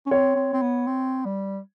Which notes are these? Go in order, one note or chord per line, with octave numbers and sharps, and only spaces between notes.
C#4
C4 C#5
C4
C4
B3
C4
G3